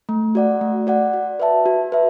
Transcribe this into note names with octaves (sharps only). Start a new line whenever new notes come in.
A3
F#4 D5 F#5
A3
F#4 D5 F#5
F#4
B4 E5 A5
F#4
B4 E5